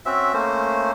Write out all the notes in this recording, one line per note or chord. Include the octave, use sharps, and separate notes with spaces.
C4 C#4 F#4 E5
A3 A#3 C#4 C5